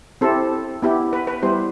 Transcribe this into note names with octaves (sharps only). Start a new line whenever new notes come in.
C4 E4 G4 A4
B3 E4 G4
B4
B4
G3 B3 E4 G4 C5